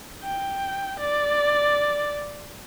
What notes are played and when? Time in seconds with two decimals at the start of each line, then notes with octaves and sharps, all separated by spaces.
0.24 G5
1.00 D5